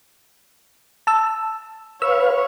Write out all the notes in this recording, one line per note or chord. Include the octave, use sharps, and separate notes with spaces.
A5 E6
B4 C#5 F5 E6